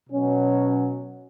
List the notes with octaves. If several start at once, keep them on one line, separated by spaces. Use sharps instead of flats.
B2 F#3 C#4